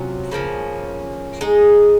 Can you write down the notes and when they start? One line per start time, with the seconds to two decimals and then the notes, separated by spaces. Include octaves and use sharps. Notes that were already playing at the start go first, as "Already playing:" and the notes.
Already playing: C3 F#3 C#4 F4
0.31 C#3 F3 A#3 C#4
1.41 G#3 D#4 G#4